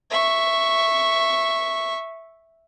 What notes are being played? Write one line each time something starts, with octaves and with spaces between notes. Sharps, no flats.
E5 C#6